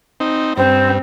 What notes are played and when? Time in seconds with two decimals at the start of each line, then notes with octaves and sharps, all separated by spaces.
0.20 C4 D#4
0.57 G2 C4 C5